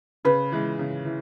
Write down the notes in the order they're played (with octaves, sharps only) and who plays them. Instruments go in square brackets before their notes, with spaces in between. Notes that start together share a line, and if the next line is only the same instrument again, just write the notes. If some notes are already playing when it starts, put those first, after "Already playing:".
[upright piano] C#3 [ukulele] B4
[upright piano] E3 G#3
C#3
E3